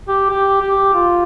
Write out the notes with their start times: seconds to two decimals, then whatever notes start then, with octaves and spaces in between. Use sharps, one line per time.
0.08 G4
0.30 G4
0.61 G4
0.94 F4